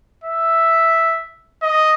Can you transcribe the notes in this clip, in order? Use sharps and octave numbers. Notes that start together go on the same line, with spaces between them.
E5
D#5